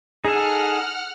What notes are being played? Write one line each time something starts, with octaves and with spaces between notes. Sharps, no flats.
D#4 G#4 A4 F#5 F6